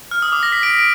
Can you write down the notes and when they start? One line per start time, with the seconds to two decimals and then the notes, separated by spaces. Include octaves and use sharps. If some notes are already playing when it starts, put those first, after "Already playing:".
0.11 F6
0.22 D#6
0.32 D6
0.43 A#6
0.52 B6
0.63 A#6 D7
0.73 B6
0.79 D7